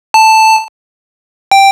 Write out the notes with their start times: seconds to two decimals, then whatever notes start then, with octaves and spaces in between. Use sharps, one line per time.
0.14 A5
1.51 G5